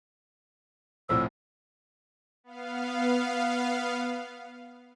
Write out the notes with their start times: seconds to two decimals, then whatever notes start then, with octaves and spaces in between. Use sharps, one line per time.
1.09 C2 A2 F3 E6
2.44 B3 F5